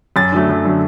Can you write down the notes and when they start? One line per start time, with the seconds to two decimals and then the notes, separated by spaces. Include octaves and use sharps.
0.16 F#2 A6
0.32 D3 F#3 A3
0.49 F#2
0.65 D3 F#3 A3